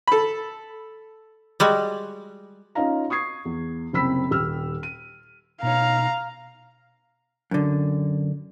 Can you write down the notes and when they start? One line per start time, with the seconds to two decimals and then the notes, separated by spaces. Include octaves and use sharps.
0.07 A4 B5
1.60 G3 G#3 F#4
2.75 C#4 D#4 F4 F5 A#5
3.10 C#6 D#6 G#6 C7
3.45 E2
3.93 F#1 C2 C4 B5 E6 B6
4.30 D#1 G4 E6 F6
4.83 D#7
5.63 B2 D#4 C#5 F5 A#5
7.51 F#2 D3